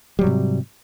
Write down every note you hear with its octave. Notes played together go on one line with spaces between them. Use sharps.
G#2 C3 F#3 G3